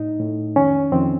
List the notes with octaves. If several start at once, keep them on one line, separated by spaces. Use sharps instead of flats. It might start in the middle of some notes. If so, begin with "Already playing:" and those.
Already playing: A2 D#4
A2
F2 D#3 C#4
F2 D#3 C4